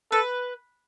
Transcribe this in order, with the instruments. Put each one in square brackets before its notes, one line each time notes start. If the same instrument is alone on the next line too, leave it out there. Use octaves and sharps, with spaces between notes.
[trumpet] A4 [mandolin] B4